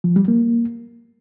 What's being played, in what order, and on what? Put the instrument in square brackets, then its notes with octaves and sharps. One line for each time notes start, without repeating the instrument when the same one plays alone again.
[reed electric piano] F3
G3
A#3